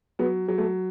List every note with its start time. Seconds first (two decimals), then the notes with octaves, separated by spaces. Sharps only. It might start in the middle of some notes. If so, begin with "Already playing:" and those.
0.19 F#3 B3
0.48 F#3
0.58 A3